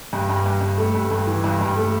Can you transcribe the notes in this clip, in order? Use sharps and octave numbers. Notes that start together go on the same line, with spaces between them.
G2
G2
G2
G2
A3
G2
G2
E3
G2
G2
A3